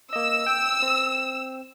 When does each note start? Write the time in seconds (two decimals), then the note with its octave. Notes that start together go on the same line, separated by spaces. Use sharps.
0.13 A#3 D#5 E6 E7
0.47 G5
0.82 C4